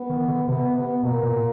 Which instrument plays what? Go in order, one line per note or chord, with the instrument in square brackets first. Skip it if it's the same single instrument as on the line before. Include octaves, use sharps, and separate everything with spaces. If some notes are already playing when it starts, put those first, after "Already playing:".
Already playing: [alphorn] B3
[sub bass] D#3
D3
[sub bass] C3 [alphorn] B3
[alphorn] B3
[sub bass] B2 [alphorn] A#3
[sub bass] A#2